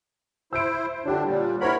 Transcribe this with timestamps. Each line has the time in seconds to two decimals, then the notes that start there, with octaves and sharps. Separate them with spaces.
0.53 E4 C5 E6 D7
1.05 D3 D4 F4 G4 C#5
1.25 A#2 G3
1.61 E4 A#4 C5 C#5 F#5 B5